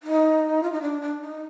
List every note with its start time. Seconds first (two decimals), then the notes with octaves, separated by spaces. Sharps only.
0.03 D#4
0.63 F4
0.72 D#4
0.81 D4
1.01 D4
1.21 D#4